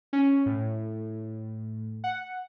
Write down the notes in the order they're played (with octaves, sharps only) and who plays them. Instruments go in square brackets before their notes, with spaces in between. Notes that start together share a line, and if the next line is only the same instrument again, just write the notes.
[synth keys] C#4
A2
F#5